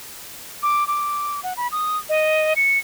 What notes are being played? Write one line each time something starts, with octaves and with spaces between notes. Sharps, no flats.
D6
D6
F#5
B5
D#6
D#5
C#7